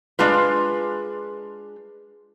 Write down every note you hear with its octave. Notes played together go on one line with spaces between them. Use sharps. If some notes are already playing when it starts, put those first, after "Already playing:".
G#3 D4 F4 B4